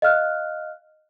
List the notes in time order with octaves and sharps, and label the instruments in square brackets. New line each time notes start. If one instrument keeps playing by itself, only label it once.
[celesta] D#5 F5 F6 F#6